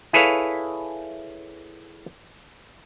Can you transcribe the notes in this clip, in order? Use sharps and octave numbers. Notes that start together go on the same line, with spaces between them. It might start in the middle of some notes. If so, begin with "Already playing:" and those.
E4 G#4 A4 B4 C#5 F5